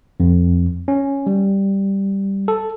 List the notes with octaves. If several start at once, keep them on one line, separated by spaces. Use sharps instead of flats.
F2
C#4
G3
A4